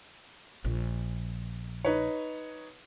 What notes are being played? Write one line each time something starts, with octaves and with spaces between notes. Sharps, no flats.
A#1
D#4 B4 C#5